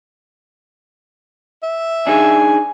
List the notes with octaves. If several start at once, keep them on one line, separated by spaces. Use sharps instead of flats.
E5
D4 D#4 G#4 G#5